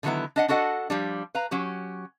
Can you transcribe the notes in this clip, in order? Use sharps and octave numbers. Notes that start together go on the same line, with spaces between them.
D3 D#3 F#3 G3 B3 E4
D4 D#5 F#5
D4 F#4 A4 D#5 F#5
F3 G3 D4
B4 F5 A#5
F#3 C#4 G4